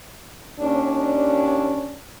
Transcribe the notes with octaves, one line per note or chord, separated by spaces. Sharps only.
D#2 C#4 D4